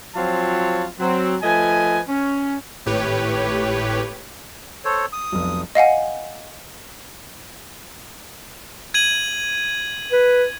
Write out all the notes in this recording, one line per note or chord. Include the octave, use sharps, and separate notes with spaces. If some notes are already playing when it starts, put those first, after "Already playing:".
F3 F#3 C4 F4 C#5 A5
F#3 C4
F3 A3 B4 D#5 G#5
C#4
G#1 A2 G4 B4 C#5
A4 C5 C#5
D#6
F1 B1
D#5 F5 F#5 G#5
G#6 D#7 F#7
B4